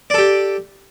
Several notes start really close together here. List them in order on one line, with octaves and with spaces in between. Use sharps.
D5 A4 G4